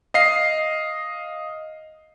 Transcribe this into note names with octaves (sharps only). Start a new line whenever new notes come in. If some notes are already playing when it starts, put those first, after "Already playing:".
D#5 F5 C7